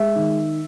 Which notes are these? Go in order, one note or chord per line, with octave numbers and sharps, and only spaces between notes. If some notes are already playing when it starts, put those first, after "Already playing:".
Already playing: G#3 E5
D#3